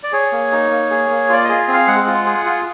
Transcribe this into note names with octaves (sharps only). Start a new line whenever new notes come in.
D5
G#4 C#5
A#3
D#4
A#3
G#4
A#3
F4 D5
D#5
G#4
C4
F5
G#3 F#5
F4
G#4
F4